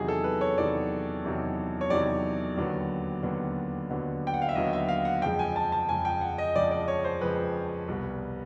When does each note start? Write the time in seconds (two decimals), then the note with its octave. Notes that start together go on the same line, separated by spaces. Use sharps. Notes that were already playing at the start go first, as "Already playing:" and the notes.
Already playing: E2 C3 D#3 F#3 G#4
0.08 A4
0.24 B4
0.41 C#5
0.57 E2 C3 D#3 F#3 D5
1.25 E2 C3 D#3 F#3
1.81 C#5
1.90 E2 C3 D#3 F#3 D5
2.57 D#2 D3 F#3 B3
3.23 D#2 D3 F#3 B3
3.90 D#2 D3 F#3 B3
4.27 G5
4.34 F#5
4.42 F5
4.49 E5
4.55 D#2 D3 F#3 B3 D#5
4.73 E5
4.89 F5
5.05 F#5
5.22 F2 C#3 F3 G#3 G5
5.39 G#5
5.56 A5
5.72 A5
5.89 F2 C#3 F3 G#3 G#5
6.05 G5
6.21 F#5
6.38 D#5
6.55 F2 C#3 F3 G#3 D5
6.71 D5
6.88 C#5
7.04 C5
7.21 F2 C#3 F3 G#3 B4
7.88 C2 B2 G3 B3